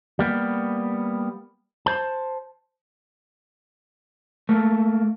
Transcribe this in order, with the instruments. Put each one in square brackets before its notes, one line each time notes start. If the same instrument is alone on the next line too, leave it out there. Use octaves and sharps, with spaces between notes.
[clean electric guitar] G3 A#3 B3
C5 A5
A3 A#3